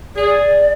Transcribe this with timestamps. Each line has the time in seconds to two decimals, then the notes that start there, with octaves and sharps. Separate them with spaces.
0.15 G#4 D5